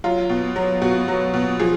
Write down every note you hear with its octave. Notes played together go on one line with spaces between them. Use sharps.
F#3 F4
B2
F#3
B2 F#4
F#3
B2
F3 G#4